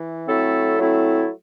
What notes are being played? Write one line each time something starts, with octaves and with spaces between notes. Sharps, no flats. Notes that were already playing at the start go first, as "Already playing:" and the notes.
Already playing: E3
F#3 A3 C4 E4 A4
F#3 A3 C4 E4 A4